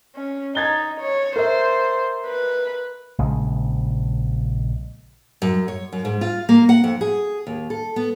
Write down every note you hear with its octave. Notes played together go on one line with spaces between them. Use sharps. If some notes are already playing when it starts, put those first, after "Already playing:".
C#4
D#4 G#6 A6 G7
C#5
A#4 C5 E5
B4
A#1 C#3 G#3
F#2
C#5
F#2
G#2
F4
A#3
F#5
F2
G#4
D#2
A4
B3